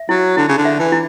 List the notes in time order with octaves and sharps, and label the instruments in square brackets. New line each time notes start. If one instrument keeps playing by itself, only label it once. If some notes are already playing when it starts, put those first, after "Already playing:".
Already playing: [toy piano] E5
[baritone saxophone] F#3 [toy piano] E4
[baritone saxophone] D3 [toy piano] E4
[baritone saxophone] C#3
D3
[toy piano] E5
[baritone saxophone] E3
[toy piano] E4